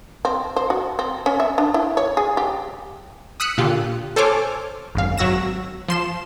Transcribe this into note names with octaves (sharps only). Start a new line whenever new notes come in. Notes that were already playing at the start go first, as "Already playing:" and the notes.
C4
C5
F#4
C4
C#4
E5
D4
E4
C#5
G#4
G4
D#6 E6 F#6 B6 C#7 D#7
A#2 D3 F4 G4
A4 C5 C#5 G#5 D6 F6
G#1 F#2 F5
G#1 F#3 F#4 E6 A#6 E7
F3 C6 E7